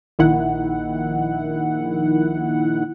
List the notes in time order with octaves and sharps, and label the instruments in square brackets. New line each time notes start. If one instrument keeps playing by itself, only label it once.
[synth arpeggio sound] A#1 D#3 E4 F#5